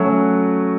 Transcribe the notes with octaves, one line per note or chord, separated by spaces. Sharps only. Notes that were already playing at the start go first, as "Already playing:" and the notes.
Already playing: F#3 A3 C#4 F#4